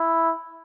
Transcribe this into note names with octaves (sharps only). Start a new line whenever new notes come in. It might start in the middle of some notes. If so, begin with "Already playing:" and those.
Already playing: E4